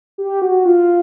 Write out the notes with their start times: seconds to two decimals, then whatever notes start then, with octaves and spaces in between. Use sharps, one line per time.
0.18 G4
0.42 F#4
0.65 F4